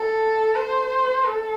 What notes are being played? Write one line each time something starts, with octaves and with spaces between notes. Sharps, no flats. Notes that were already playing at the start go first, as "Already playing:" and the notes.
Already playing: A4
C5
A4